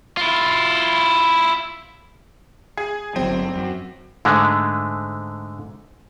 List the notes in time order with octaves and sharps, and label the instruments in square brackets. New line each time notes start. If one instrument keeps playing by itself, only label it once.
[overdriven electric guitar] E4 F4
[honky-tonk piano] G#4
[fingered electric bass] G1 F#3 [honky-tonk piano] C4
[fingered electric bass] F#2
[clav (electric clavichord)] G#2 D3 G#3 A3